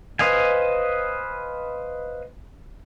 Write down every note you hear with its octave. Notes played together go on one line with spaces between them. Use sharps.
B4 C5 D#5 F5 G#5